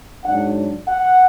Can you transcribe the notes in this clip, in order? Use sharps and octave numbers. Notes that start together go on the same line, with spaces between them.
G#2 F#3 D4 F#5
F#5